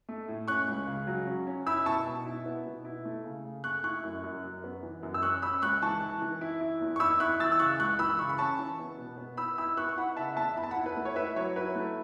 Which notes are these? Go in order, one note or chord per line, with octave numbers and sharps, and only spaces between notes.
A3
A2
C#4 C#6 F#6
C#2
C#3
F#3
C#4
C#4
E4 B5 E6
B2 A5 C#6
B2
E4
B3
B2
E4
A3
C#3
C#3
A3 C#6 F#6
E4 C#6 F#6
F#2
F#2
F#2
B3
E3
F#2
E6
C#4 C#6 F#6
C#4 B5 E6
C#2 C#6 F#6
E3 A5 C#6
E3
E3
E4
E4
E2
C#6
E4 B5 E6
E4 C#6 F#6
E3 E6 A6
E6
C#3 C#6 F#6
C#2 C#6 F#6
E3 B5 E6
C#3 C#6
B5
C#4 A5 C#6
E3
B3
B2
B3
E4 B5 E6
E4 B5 E6
B3 C#6 F#6
C#6
E4 F#5 B5
C#3 E5 A5
E2 E5 A5
E2 B5
A5
F#5 B5
E4
B4
A3
C#5
E4 B4 E5
F#3 C#5
E4 B4
A3